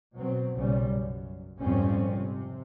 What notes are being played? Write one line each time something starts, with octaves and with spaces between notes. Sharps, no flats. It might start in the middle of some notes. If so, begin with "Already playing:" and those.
B2 F#3 C4
B1 A#2 C#3 G3 C#4
F#2
G#1 F2 A#2 G3 C4 C#4
C3